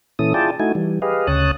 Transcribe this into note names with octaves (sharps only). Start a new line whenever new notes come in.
A#2 E3 C#4 E4 A4 D#6
E4 F4 G#4 D5 G5 A5
A3 D#4 E4 F#4 G#5
E3 G3
G4 G#4 B4 D#5 F5
D2 C#3 C#5 A5 D#6 F#6